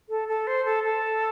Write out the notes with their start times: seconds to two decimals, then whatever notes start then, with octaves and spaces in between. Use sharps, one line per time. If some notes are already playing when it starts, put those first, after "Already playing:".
0.09 A4
0.28 A4
0.47 C5
0.65 A4
0.84 A4